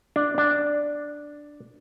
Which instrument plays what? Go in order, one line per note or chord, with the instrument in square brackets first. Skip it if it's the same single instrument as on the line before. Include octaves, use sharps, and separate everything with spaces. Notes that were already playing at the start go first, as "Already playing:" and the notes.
[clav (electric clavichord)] D4
D4